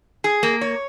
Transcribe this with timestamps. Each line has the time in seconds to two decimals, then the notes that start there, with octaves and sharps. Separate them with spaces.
0.24 G#4
0.43 A#3
0.61 C#5